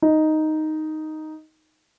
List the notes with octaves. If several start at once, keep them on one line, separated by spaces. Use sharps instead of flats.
D#4